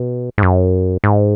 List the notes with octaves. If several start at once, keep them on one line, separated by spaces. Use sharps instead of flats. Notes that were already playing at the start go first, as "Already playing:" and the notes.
Already playing: B2
G#2
F#2
G#2